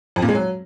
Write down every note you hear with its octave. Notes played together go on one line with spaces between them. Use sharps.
F2
A#2
G#3
F#3